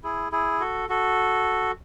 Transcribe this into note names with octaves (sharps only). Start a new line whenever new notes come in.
E4 G#4
E4 G#4
F#4 A4
F#4 A4